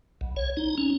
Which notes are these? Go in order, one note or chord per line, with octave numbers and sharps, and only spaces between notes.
B1
C#5
D#4
C#4